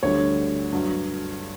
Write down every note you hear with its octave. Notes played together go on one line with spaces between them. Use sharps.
D2 D3 G3 C#5
G2 F#3